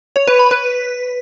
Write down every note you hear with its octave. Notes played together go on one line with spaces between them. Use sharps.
C#5
B4
B5
B4